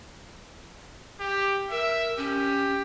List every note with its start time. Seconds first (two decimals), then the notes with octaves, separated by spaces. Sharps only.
1.20 G4
1.71 A#4 E5
2.17 C#4 G4